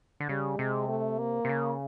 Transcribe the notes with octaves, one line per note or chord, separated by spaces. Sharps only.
D3
C#3 G3
C3 G#3
A3
A#3
C3
C#3